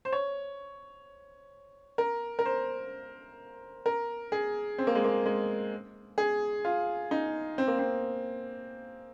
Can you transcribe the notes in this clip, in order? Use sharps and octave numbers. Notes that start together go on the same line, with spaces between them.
C5
C#5
A#4
A#4
C5
A#4
G#4
C4
A#3
G#3
A#3
G#3
G#4
F4
D#4
C4
A#3
C4